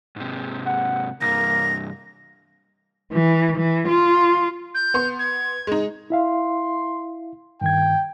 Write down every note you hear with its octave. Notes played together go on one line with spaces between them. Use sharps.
G#2 C3
F#5
C2 G2 A#3 A#6
E3
E3
F4
G6
B3 C6
G#6
G#3 D#4
E4 E5 F5 C6
G2 D#3 G5 G#6